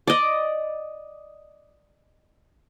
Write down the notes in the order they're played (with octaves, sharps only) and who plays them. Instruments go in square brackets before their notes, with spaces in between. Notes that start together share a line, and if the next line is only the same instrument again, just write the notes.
[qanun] D5 D#5